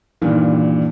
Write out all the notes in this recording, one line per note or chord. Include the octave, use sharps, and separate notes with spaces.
G2 A#2 D#3 E3